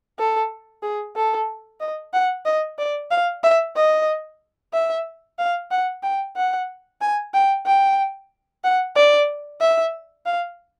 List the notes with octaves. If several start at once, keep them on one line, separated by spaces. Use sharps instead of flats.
A4
G#4
A4
D#5
F#5
D#5
D5
F5
E5
D#5
E5
F5
F#5
G5
F#5
G#5
G5
G5
F#5
D5
E5
F5